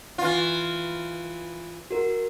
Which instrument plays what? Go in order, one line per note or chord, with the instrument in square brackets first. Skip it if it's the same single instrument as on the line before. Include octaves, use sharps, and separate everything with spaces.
[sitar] E3 F4
[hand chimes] F#4 A#4